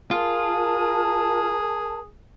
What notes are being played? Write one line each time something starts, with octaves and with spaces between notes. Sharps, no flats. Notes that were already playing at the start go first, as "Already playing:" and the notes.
F4 G#4 A#4 A5